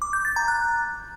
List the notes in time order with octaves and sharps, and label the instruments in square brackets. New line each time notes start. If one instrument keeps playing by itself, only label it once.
[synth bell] D6
G6
A6
A#5
F#6